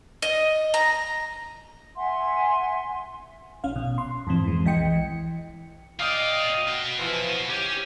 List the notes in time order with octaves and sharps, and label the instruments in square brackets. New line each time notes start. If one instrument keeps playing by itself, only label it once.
[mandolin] D#5
A#5
[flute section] E5 F#5 G#5 C6
[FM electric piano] A#1 C#4 F5
B2
C6
F2 G#2 E3 C4
E3 G#3
B1 E3 D#5 G5 C#7
[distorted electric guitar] F4 D5 [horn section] D#5 F5 G5
[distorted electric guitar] F#4 D#5
[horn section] E3 F3 F4
[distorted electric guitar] C#4 [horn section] G4